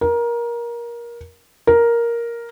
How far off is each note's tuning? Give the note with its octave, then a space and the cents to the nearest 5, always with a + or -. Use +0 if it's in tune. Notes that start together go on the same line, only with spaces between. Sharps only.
A#4 +20
A#4 +5